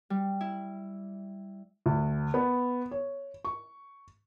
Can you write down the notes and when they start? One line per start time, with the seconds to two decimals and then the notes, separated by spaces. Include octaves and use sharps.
0.10 G3
0.41 E4
1.86 D2
2.34 B3
2.91 C#5
3.45 C#6